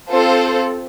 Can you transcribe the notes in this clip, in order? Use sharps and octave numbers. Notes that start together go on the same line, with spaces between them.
C4 F4 A4 C5